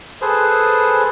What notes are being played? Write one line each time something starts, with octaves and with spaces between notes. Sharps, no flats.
G#4 A4 B4 C5